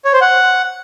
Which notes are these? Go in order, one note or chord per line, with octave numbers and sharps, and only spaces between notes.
C#5
C5
F#5